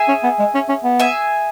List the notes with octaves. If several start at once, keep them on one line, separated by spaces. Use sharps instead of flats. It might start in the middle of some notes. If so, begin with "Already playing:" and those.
Already playing: G#4 E5 G#5
C#4
B3
G#3
C#4
C#4
B3
G#4 E5 G#5